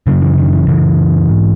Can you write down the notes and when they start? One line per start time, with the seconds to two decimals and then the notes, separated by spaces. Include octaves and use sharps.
0.07 F#2 C#3 F#3
0.22 E3
0.38 D#3
0.53 E3
0.67 F#2 C#3 E3
1.29 G#2